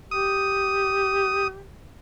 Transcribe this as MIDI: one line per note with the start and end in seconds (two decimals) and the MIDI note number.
0.11 1.62 67
0.11 1.48 87